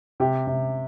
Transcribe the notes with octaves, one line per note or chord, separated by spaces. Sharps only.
C3 G4
C3